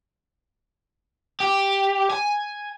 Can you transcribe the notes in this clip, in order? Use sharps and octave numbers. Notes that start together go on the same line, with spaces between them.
G4
G#5